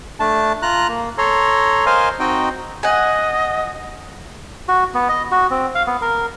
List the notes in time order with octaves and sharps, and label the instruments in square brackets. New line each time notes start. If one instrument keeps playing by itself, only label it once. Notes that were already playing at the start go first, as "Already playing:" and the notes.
[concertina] A3 D4 A5
F4 A#5 F#6
A#3
A4 C#5 A#5 C6
A#4 C5 D#5 F5 G#5 C6
C4 D#4 F#4 D#5 G5
[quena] D#5 [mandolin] F#5 G#5
[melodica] F#4
B3
D#5
F#4
C4
F5
B3
A#4